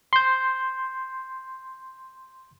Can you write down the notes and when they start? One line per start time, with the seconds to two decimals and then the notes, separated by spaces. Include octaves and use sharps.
0.13 C6 G6